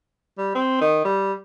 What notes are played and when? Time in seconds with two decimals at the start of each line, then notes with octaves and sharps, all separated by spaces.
0.38 G3
0.55 C4
0.81 D#3
1.05 G3